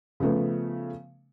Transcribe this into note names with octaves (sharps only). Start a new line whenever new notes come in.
C#3 F3 A3 B3